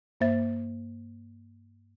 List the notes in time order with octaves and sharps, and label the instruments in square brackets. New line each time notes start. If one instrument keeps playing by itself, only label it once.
[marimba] G2 A#3 C5 E5 A6